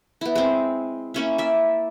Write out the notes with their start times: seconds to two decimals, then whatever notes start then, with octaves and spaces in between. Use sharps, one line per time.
0.21 B3 E4
0.35 G#3 C4
1.14 A#3 C#4 E4
1.38 D5 E5